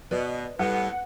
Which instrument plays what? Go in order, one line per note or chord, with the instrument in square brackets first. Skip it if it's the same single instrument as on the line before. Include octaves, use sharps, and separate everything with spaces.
[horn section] B2 [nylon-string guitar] B4 D5 D#5
[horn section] A2 B3 [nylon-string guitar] G3 [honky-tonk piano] F#5